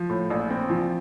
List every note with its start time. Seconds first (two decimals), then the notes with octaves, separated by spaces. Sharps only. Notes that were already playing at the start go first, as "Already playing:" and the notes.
Already playing: F3
0.10 A2
0.30 A#1
0.50 C4
0.70 F3